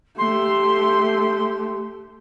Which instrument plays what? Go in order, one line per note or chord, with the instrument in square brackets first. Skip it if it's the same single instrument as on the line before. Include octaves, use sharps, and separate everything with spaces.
[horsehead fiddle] A3 G4 [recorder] C6